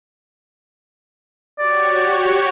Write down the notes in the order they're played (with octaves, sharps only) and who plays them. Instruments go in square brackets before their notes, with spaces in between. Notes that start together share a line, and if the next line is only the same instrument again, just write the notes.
[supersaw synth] F#4 G4 C#5 [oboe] D5